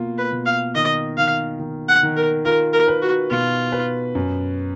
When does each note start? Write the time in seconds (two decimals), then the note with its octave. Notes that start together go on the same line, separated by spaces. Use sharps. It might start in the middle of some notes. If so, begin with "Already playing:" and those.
Already playing: B2 A#3 F4
0.18 B4
0.32 B2
0.46 F5
0.75 D#3 D#5
1.17 D#3 F5
1.60 D#3
1.88 F#5
2.03 D#3
2.16 A#4
2.45 F4 A#4
2.73 A#4
2.88 B4
3.02 F#4
3.31 B2 F4
3.72 B4
4.15 F#2